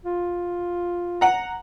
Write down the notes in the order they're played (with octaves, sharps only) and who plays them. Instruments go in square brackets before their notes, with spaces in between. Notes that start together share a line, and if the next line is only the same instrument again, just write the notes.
[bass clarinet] F4
[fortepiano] F#5 A#5